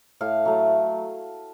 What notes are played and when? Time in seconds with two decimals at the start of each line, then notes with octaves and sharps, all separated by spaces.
0.21 A2 F5
0.45 F#3 A3